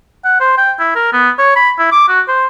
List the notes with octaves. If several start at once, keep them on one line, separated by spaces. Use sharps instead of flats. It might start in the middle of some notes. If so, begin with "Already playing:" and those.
F#5
C5
G5
E4
A#4
B3
C#5
B5
E4
D6
F#4
C5